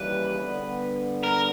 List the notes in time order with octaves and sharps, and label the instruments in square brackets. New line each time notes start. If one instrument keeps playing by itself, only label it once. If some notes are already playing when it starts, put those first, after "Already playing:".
Already playing: [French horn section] D#2 C#3 E3 G3 [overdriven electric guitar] B4
[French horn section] D3 G3 B3
[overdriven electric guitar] A#4